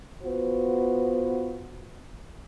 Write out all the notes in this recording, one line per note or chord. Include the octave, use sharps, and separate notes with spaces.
B3 F4 F#4 B4 C5